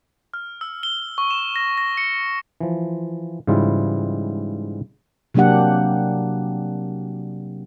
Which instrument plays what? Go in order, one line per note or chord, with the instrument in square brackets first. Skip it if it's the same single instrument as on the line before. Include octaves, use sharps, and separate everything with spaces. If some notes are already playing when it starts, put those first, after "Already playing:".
[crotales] F6
E6
G7
C#6
E7
A#6
A#6
C#7
[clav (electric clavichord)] E3 F3
G#2 C#3 E3 G3 E4 F4
[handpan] C3 F#3 A#3 D4 G4 F#5